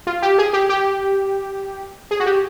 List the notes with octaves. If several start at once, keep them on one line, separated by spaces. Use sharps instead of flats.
F4
G4
G#4
G4
G4
G#4
F#4
G4